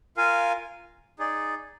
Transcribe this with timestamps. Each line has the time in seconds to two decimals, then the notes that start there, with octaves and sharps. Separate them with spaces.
0.17 F4 A#4 F5 G#5
1.19 D#4 G#4 D5